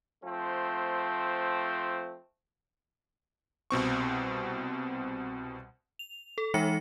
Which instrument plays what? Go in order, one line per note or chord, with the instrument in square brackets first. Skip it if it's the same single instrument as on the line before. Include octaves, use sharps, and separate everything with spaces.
[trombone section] F3 A3 C4
[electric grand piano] C2 B2 C4 C#6
[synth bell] F7
A4
E3 G#3 D#4 E5 A#6 C#7